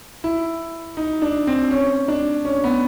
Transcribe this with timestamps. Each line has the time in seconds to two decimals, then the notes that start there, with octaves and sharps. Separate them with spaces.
0.24 E4
0.97 D#4
1.22 D4
1.47 C4
1.71 C#4
2.08 D4
2.45 C#4
2.64 B3